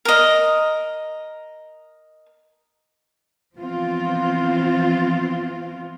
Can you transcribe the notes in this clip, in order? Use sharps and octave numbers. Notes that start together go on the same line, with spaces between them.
A#4 D#5
E3 F3 B3 C4 F4